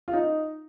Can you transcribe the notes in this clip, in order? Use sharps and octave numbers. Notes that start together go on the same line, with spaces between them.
F4
D#4